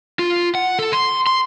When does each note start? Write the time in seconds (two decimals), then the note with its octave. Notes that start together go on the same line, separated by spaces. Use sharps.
0.19 F4
0.55 F#5
0.79 A4
0.93 C6
1.27 C6